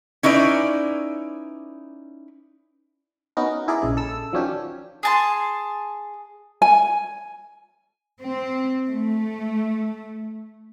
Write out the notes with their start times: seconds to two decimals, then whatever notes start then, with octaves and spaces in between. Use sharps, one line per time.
0.23 C#4 D#4 E4 B4 D5
3.37 B3 C#4 D#4 F#4 A#4
3.68 E4 G#4 A#4 D5
3.82 A#1 C#3 G#3
3.97 A4 E6
4.32 D#3 F3 F#3 C#4 D4 G4
5.03 G#4 A5 C6
6.62 G#5
8.21 C4
8.88 A3